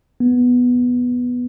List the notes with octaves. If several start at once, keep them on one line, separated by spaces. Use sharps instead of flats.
B3